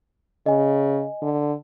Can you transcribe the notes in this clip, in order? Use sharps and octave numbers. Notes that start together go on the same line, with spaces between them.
C#3 D#5 G#5
D3